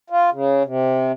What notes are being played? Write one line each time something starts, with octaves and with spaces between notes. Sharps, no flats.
F4
C#3
C3